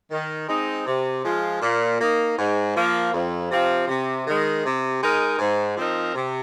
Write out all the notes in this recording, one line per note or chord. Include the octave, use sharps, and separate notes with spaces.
D#3
G#3 C4 D#4
C3
F3 G#3 F4
A#2
A#3 D#4
G#2
F3 A#3
F2
C3 F3 C4 F4
C3
D#3 G#3
C3
G#3 D#4 A#4
G#2
F3 C4 D#4 A#4
C3